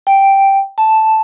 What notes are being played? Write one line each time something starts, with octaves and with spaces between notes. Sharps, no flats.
G5
A5